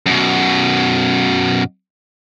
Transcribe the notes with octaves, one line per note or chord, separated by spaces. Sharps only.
F#2 B2